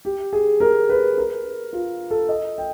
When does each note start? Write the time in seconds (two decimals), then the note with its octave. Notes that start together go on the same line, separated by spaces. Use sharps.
0.05 G4
0.33 G#4
0.60 A#4
0.89 B4
1.18 A#4
1.73 F4
2.11 A4
2.29 D#5
2.58 G5